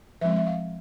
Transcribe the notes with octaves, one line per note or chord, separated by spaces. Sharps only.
F3 G#3 C4 E5
E5
F5